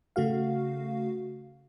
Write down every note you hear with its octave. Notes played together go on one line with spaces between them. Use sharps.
C#3 A3 F#4 F5